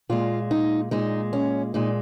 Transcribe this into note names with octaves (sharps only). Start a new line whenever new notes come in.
A#2 G#3 F4
D#4
A#2 G#3 D#4
C#4
A#2 G#3 D#4